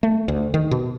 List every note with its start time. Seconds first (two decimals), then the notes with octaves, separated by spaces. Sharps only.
0.03 A3
0.28 D2
0.54 D#3
0.71 B2